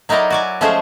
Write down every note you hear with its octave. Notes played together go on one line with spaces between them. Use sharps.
F#3 D#4 E4 A#4 D5 D#5
F#4 D5 G#5
F3 G#3 A3 C#4 G#4 C5